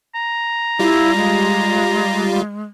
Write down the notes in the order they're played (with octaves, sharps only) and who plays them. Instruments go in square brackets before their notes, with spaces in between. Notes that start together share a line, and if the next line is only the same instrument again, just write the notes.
[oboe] A#5
[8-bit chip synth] G3 F4 [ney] E4
[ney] G#3